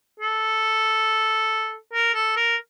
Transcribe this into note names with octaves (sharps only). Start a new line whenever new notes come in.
A4
A#4
A4
A#4